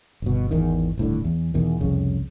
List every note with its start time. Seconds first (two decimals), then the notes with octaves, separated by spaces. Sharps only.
0.22 G1 B2
0.51 G#1 E2 D#3
0.97 D#1 A2 D3
1.24 E2
1.54 E2 B2 D#3
1.80 C2 F2 C#3